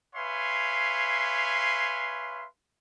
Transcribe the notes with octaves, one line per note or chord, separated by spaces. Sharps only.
B4 C#5 E5 F5 G#5 C6